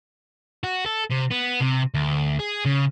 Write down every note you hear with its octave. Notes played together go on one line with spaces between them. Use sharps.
F#4
A4
C3
B3
C3
D2
G#4
C#3